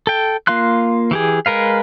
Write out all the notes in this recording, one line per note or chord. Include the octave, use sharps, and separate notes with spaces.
A4 G5
A#3 F4 F5 C6 F#6
E3 G4 G#4
G#3 A#4 B4 F5